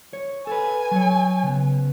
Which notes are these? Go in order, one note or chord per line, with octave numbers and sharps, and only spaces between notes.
C#5
A4 B4 G#5
F#3 C#5
C#3 B3